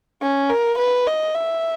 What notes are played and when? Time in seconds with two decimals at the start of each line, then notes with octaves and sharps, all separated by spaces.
0.22 C#4
0.49 A#4
0.78 B4
1.07 D#5
1.34 E5